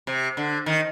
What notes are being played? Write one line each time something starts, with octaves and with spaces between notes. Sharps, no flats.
C3
D3
D#3